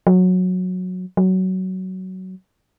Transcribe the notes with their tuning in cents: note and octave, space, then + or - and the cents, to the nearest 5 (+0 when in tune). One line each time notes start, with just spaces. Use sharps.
F#3 -15
F#3 +15